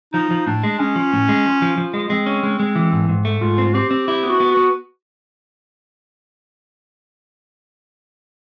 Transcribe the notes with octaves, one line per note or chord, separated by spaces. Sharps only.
F3 D#4
F3
A2 D4
G#3
G#3 C#4
F3
A2
G#3
F3
F3
F3
G#3
G#3 C4
C#4
G#3
G#3
E3
G#2
G#2
A3
G#2 F4
C4
C4 G4
C4
E4 G4
B3
F#4
B3
F#4
B3